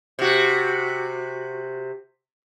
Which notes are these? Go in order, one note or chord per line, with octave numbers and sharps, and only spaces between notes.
C3 F#4